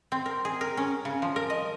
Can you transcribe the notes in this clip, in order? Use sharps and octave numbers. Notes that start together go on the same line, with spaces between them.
C4
A#4
G#4
A#4
C#4
C#3
F3
A#4
D#5